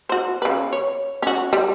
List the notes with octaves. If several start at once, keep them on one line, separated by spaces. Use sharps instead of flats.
F#4 C5
C#3 B4
C#5
C#4 F#4
G3